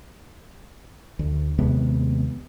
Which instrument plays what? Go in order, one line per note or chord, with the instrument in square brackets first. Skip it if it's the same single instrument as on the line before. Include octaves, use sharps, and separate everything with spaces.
[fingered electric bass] D2
D#2 C3 G#3 B3